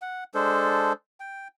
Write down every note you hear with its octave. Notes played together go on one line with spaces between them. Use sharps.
F#5
G#3 D4 A4 C5
G5